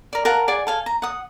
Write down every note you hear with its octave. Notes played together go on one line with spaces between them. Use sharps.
A#4 D5
A#4 F5 F#5 A5
G#4 D5 F#5 D6
A4 F5 G#5
A#5
F#5 D#6